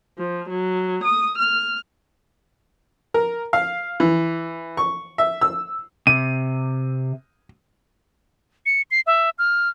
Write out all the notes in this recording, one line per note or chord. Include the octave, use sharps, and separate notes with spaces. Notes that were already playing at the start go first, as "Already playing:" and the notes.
F3
F#3
D#6
F6
A#4
F5
E3
C#6
E5
E6
C3 D#7
C#7
C7
E5
F6